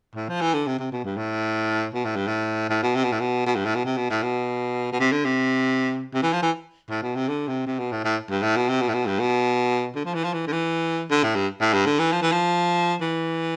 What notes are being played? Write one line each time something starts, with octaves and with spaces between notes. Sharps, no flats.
A2
F3
E3
D3
C3
C3
B2
G2
A2
B2
A2
G2
A2
A2
B2
C3
B2
A2
B2
B2
G2
A2
B2
C3
B2
A2
B2
B2
C3
D3
C3
C3
E3
F3
E3
A2
B2
C3
D3
C3
C3
B2
A2
A2
G2
A2
B2
C3
B2
A2
B2
G2
B2
D3
F3
E3
F3
E3
D3
E3
D3
A2
G2
A2
G2
D3
E3
F3
E3
F3
E3